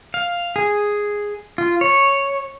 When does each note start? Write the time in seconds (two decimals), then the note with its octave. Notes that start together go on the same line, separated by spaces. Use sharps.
0.14 F5
0.56 G#4
1.58 F4
1.81 C#5